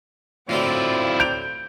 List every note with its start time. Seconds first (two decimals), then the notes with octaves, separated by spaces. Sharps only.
0.49 A2 D3 F#3 C4 E4 F4 D5
1.20 G6 D7 F7